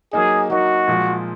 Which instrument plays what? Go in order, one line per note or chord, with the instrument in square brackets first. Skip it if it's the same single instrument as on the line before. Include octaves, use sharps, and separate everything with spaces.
[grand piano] F#3 A#3 D#4 [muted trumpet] G#4
[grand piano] F#3 A#3 D#4 [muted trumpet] F#4
[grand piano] A#2 F3 G#3